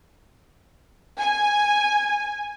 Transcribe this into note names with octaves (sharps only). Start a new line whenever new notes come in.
G#5